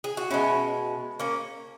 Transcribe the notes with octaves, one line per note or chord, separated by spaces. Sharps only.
G#4
F#4
B2 G#3 C#4 E4
A#3 C#4